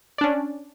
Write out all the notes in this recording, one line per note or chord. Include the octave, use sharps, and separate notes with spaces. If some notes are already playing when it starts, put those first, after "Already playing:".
C#4 D4 D5